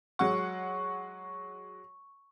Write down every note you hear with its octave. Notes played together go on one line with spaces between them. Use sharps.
F#3 G#3 F#5 C#6